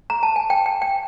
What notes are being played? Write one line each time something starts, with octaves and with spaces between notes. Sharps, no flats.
A#5
A5
G#5
G5
G5
G5